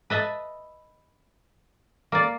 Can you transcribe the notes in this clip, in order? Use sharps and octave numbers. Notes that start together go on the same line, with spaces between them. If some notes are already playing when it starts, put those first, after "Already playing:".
B4 D#5 E5 A5
A#3 D5